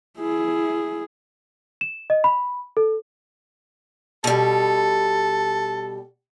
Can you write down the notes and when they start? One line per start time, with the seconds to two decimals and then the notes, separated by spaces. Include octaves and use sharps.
0.18 E4 G#4
1.81 E7
2.10 D#5
2.24 B5
2.77 A4
4.24 B2 G3 A4